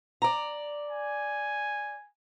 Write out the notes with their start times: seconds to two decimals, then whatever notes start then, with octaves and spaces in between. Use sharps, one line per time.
0.22 D5 A#5
0.89 G#5